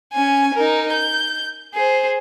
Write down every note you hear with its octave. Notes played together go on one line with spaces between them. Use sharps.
C#4 G#5
D#4 A#4
G6
G#4 C5